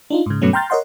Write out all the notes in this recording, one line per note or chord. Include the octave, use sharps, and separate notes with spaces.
D4 D#4 F4
G#2 C#3
G2 B2 F#3 A3 B3 C#4
G5 A#5 C6 F6 G6 A6
A#4 C#5 D#5 F#5 C6